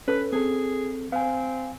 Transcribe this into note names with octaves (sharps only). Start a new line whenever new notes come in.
C#4 A4 B4
C4 G#4 A4
C4 F5 G#5